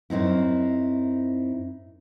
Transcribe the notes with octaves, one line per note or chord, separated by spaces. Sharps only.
F#2 C4 D#4 E4